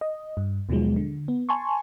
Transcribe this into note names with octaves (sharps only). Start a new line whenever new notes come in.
D#5
G2
D#2 B2 D#3 F3 F#3 G#3
D3
B3
G#5 A5 C6 C#6